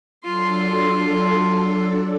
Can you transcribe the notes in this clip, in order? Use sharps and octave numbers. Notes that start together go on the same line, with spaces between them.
F#3 D4 F4 A4 C6